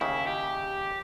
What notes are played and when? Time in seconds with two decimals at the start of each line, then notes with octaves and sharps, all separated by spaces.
0.01 D#2 C#3 E4
0.27 G4